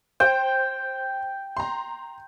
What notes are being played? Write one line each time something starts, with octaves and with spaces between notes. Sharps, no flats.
C5 G5
A#5 C6